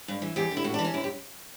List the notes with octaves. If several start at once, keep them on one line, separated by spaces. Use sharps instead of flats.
G2
E3
E2 G4
D3
E4
A2 F#4
D4
E3
C#4
F#2 E4
G4